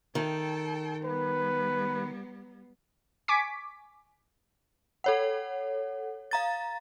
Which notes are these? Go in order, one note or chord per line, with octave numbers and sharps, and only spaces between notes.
D#3 A4 G5
G3 B3 B4
G#5 C#6 D6 B6
A4 C#5 F#5
F5 A#5 A6